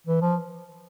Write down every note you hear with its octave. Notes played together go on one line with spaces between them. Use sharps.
E3
F3